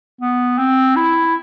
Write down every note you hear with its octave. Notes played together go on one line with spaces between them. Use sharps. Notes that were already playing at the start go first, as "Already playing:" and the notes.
B3
C4
E4